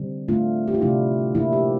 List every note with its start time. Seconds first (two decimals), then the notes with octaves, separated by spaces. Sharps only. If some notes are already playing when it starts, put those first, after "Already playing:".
Already playing: D3 G3 C4
0.28 D3 A3 D4 F4
0.68 G4
0.74 F4
0.81 C3 F3 A3 D4 E4
1.35 F3 A#3 D4 E4
1.53 G4